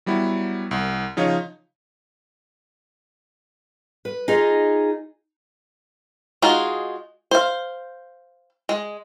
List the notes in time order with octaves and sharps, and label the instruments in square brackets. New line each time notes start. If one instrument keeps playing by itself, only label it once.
[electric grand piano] F#3 G3 B3 E4
C2
C#3 F3 D#4 C#5 F5
[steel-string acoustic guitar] B4
D#4 F4 G#4 D#5
[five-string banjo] G#3 D#4 F4 F#4 G#4
C5 F5
G#3